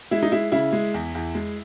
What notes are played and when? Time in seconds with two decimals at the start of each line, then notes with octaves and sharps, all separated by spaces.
0.11 G#3 E4
0.23 D#4
0.32 G#3 E4
0.52 C#3 E4
0.73 G#3
0.94 E2
1.15 E2
1.35 G#3